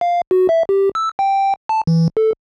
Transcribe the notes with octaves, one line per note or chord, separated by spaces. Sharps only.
F5
F#4
E5
G4
E6
G5
A5
E3
A4